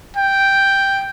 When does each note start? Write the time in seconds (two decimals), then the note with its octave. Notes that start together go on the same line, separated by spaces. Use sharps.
0.17 G5